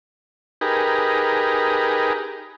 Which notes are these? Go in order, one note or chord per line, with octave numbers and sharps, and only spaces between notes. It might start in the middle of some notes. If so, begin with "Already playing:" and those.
D#4 G4 G#4 A#4 B4